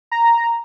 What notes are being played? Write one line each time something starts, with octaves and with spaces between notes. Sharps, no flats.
A#5